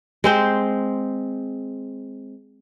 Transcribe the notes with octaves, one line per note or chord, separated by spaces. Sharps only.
G#3 C4 C5